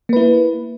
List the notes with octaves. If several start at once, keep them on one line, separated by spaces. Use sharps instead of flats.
A#3 E4 B4